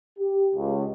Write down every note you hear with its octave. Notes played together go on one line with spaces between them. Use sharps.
G4
C#2